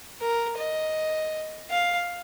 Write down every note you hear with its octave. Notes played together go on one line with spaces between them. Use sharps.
A#4
D#5
F5